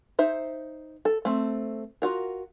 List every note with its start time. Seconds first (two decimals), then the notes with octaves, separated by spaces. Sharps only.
0.19 D#4 C5 E5
1.05 A4
1.25 A3 C4
2.02 F4 F#4 A#4